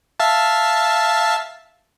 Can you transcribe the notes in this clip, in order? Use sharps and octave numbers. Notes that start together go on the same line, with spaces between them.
E5 F5 A5